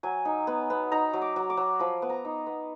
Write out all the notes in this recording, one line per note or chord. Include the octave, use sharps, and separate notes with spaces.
F#3 G#5
D#4
B3
B3
D#4 A#5
F#3
D6
F#3
D6
F#3
F3 B5
B3
A#5
D#4
B3